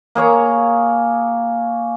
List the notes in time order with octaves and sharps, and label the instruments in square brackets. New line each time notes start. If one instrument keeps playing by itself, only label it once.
[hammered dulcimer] A#3 G#4 C#5 A#5